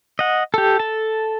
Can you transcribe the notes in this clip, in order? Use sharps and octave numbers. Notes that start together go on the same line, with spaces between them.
D#5 F#5
G4 A4
A4 A5